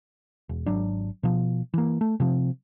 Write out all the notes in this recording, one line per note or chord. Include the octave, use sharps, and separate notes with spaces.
E1
G#1 F#3 D4
B2 F3
E3 A#3
A3
C3 F3 C4